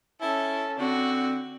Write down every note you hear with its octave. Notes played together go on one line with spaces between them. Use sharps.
C#4 E4 A4
D3 C4 F#4